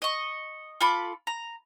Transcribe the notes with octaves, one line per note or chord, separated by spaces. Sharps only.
D#5 C#6
F4 A4 B5 D6
A#5